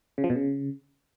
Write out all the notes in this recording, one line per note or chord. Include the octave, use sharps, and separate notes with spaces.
C#3
F3
B2
C#3